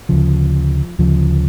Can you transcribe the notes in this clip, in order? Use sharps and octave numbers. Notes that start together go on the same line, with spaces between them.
D2 C#3 F3
D2 C#3 F3